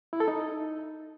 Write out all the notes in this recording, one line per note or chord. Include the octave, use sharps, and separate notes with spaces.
E4
A4
D#4